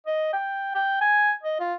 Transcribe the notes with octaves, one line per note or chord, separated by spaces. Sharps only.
D#5
G5
G5
G#5
D#5
F4